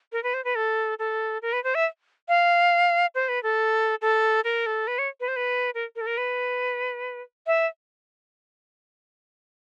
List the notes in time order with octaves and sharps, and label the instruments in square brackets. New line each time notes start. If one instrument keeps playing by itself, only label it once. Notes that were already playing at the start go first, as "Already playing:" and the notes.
[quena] A#4
B4
C5
B4
A4
A4
A#4
B4
C5
E5
F5
C5
B4
A4
A4
A#4
A4
B4
C#5
B4
C5
B4
A#4
A#4
A4
A#4
B4
E5